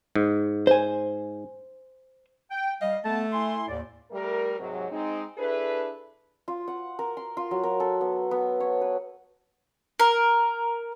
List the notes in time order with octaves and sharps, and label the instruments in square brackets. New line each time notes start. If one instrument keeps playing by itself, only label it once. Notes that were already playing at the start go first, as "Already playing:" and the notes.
[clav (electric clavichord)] G#2
[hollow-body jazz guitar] C5 G#5
[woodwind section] G5
[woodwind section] G3 F5 [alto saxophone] D#5
[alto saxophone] A3 [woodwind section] B3 A5
[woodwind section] E4 G#5 C6
D#2 A2 D5
[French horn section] G3 A3 A#4
G#2 C3 F#3
G#3 C4 D#4
D4 E4 G#4 A4 B4
[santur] F4
F#5
A#4
C6
F4
F#3
A#4
A4
B3
B3
C#5
B4
[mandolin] A#4